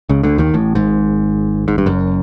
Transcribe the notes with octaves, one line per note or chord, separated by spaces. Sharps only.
C#2 C#3
D2 D3
D#2 D#3
A1 A2
G#1 G#2
G#2
G2
F#1 F#2